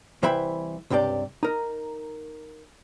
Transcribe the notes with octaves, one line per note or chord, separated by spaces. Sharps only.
C2 E3 C5 E5 G5 B5
C#2 G2 C3 G4 D5
D#4 A#4